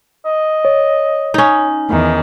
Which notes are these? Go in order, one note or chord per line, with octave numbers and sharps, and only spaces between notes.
D#5
C#5
C#4 D#4
E2 D#3